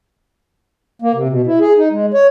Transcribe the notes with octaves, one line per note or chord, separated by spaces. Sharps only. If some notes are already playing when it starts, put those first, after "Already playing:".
A#3
C3
B2
E4
G#4
D#4
G#3
C#5